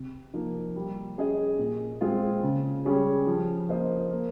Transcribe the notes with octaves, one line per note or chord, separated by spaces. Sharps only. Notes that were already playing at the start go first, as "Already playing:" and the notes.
Already playing: C3
F3 A#3 D#4
G3
C#4 G#4 D#5
A#2
G#3 C4 F4 G#4
C#3
G3 C#4 G#4
F3
A#3 F4 C5 D#5
A#3